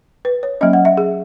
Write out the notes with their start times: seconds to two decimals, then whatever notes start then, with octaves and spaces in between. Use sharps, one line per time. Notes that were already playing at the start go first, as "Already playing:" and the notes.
0.25 B4
0.43 C#5
0.61 F#3 A#3 C#4 D#5
0.73 F#5
0.85 E5
0.97 G#4